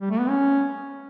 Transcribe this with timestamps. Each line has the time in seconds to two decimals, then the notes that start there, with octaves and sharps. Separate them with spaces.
0.01 G3
0.10 A3
0.19 B3
0.29 C#4